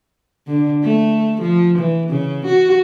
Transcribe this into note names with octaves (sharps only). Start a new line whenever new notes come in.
D3
A3
F3
E3
C#3
F#4